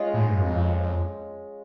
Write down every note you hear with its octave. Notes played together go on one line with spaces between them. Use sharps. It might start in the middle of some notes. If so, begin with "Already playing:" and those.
Already playing: G#3 C#4 F4
A2
G#2
G2
F#2
F2